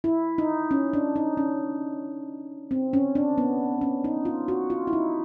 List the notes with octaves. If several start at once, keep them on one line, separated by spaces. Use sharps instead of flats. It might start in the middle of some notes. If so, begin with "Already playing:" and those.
E4
D#4
C#4
D4
D#4
C#4
C4
C#4
D4
B3
C#4
D#4
F4
F#4
F4
E4
D#4